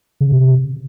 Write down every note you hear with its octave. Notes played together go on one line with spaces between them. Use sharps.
C#3
C3